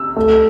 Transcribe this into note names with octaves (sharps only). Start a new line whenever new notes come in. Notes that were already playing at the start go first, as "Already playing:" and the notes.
Already playing: E6
A3